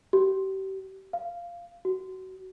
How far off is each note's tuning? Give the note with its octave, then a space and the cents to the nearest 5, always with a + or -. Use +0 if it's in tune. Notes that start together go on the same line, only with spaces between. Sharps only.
G4 -35
F5 -10
F#4 +20